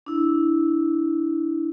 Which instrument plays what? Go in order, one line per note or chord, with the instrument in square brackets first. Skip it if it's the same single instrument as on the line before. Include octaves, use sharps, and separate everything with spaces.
[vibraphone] D4 E4